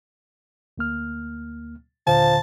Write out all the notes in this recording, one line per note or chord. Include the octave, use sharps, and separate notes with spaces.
D2 A#3 F6
D#2 A#2 D3 F3 A5